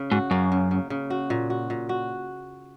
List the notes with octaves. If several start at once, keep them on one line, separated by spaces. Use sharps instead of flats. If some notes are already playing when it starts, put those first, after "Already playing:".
Already playing: C#3
G#2 F#4
F#2 A#3
C#3
C#3
C#3
F#4
A#2
F#4
A#2
F#4